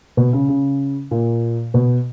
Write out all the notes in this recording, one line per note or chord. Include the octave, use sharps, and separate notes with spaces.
B2
C#3
C#3
A#2
B2